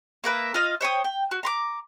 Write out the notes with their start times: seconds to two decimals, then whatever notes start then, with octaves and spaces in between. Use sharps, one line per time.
0.24 A#3 A#4 B4 E5
0.54 F4 D#5 F5
0.81 C5 C#5 G5 D#6
1.04 G5
1.31 F#4
1.43 A#5 C6 D6